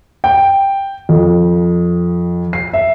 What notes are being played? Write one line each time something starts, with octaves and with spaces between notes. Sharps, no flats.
G5
F2
C7
E5